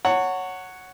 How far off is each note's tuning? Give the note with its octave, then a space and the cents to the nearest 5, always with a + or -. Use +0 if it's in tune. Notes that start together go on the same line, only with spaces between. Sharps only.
C#5 +0 F#5 +0 A#5 -45